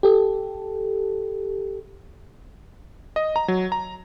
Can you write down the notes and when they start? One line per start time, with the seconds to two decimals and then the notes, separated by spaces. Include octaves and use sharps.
0.03 G4 A4
3.16 D#5
3.36 A#5
3.48 F#3
3.72 A#5